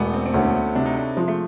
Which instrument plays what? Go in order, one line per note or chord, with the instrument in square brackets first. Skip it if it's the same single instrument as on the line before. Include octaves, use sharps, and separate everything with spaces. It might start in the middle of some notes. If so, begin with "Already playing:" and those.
Already playing: [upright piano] E1 [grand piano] A3 B3
[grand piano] C4
C4
[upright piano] D2 [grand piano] C#4
[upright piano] C3 [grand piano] D4
[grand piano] D#4
D4
[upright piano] F3 [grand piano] G#3
[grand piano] A3